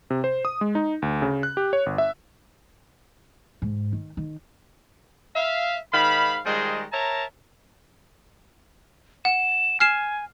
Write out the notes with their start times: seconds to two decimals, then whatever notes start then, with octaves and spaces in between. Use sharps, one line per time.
0.10 C3
0.24 C5
0.45 D#6
0.61 G#3
0.75 D#4
1.02 D2
1.22 C#3
1.43 F#6
1.57 G4
1.73 C#5
1.86 G1
1.98 E5
3.62 G#2
3.93 D#3
4.17 D#3
5.36 E5 F5
5.93 G#2 D#3 F5 B5
6.46 D#3 G3 G#3 F4 G#4 C5
6.93 A#4 C#5 E5 A5 A#5
9.25 F#5 E7
9.80 G#5 F6 C7 E7